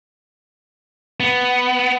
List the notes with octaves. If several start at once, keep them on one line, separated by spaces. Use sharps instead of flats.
B3